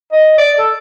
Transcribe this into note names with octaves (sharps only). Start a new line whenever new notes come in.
D#5
D5
A4